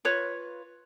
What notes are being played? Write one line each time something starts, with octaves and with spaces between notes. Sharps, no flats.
F4 B4 C#5